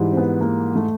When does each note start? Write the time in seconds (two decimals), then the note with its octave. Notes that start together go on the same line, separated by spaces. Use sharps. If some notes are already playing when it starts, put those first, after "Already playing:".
Already playing: G#2 E3 G3
0.12 C4
0.17 B3
0.41 A#3
0.76 A3